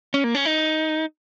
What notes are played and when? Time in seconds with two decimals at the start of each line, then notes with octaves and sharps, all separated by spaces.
0.14 C#4
0.24 A#3
0.35 C#4
0.45 D#4